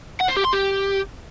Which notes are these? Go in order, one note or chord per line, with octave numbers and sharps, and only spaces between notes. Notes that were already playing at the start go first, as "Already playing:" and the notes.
F#5
C5
G4
C6
G4